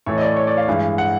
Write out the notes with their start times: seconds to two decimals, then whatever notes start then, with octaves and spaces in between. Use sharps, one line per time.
0.06 A2 E3 A3 C#5
0.18 D#5
0.22 D5
0.37 C#5
0.47 D5
0.57 F5
0.68 G2 E3 G#3
0.98 F#5